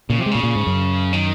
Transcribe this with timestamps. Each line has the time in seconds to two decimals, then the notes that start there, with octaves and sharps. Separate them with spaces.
0.10 A#2 C#3
0.18 C3 F3
0.26 G#3
0.31 A#2 C#3
0.43 A#2
0.55 G#2
0.67 F#2
1.13 D#3